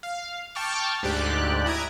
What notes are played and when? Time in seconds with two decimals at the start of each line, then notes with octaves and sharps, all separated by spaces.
0.03 F5
0.55 G5 A5 C#6 D6 F6
1.03 D2 G#2 G4 D5 F#6
1.66 E4 A#5 D#6 G#6 D7